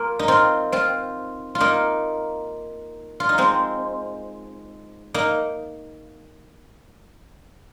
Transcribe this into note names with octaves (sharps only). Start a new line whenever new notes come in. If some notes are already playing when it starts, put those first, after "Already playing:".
Already playing: A#3 F4
D#4
C4 F4
C4 F4
F4
A#3 D#4
F4
D#4
G#3 C4
A#3 D#4